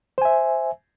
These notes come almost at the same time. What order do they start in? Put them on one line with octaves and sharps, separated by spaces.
C5 G#5 E5